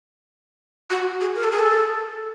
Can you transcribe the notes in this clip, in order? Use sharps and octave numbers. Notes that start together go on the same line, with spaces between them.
F#4
G#4
A#4
A4
G#4
A4